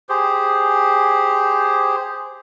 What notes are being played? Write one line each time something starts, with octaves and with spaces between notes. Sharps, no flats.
G4 G#4 C5